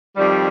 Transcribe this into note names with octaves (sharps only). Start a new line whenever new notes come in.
F2 D#3 G3